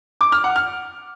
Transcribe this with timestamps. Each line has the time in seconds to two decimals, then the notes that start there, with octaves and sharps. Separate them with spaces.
0.21 D6
0.32 F6
0.44 F#5
0.56 F6